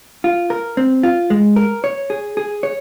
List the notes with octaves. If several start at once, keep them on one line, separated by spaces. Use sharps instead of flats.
F4
A#4
C4
F4
G#3
A#4
C#5
G#4
G#4
C#5